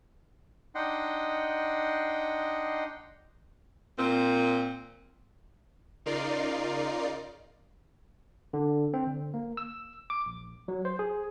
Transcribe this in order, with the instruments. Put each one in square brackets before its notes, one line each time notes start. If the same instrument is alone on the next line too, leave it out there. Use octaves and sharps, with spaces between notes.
[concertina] D4 D#4 D#5 F#5 G5 C6
[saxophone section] A#2 C4
[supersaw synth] C#3 D#4 F4 A#4 D5 C7
[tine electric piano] D3
C4
D3
A#3
E6
D6
A#1
F#3
C5
G#4